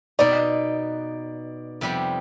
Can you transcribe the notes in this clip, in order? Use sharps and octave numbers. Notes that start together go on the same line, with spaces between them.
B2 B3 D#4 D5
F2 C3 G3 B3